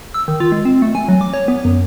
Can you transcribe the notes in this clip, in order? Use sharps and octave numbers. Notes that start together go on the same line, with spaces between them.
E6
D#3
F4
G#3
C4
A3
G#5
F#3
D6
C#5
B3
F#2